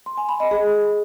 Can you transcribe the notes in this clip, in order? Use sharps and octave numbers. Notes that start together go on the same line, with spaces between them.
C6
G#5
B5
D#5
G#4